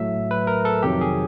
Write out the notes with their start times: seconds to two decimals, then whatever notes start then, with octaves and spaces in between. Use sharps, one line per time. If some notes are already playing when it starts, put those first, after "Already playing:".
Already playing: A2 F#3 A3 E5
0.31 B4
0.47 A#4
0.65 A4
0.83 F2 C3 D#3 F#3 G4
1.01 G#4